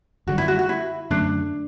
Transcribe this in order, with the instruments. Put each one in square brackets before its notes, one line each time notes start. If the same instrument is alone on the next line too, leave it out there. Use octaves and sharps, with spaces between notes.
[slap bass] F#2 D3 G3 [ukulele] F#4
[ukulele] E4
F#4
F#4
E4
[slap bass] F#2 D3 A3 [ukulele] D4